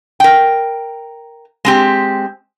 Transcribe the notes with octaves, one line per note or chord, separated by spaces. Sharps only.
A#4 G5
G#3 C4 G4